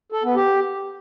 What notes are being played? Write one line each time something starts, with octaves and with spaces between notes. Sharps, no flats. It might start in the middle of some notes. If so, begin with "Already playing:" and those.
A4
B3
G4